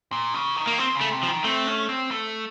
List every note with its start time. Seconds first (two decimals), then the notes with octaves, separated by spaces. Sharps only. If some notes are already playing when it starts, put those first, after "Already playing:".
0.12 A#2
0.34 C#3
0.56 D#3
0.67 A#3
0.78 F3 C4
0.95 C#3
1.01 A3
1.12 C3
1.23 F3
1.28 D#3
1.44 A3 C4
1.67 C#4
1.89 C4
2.11 A3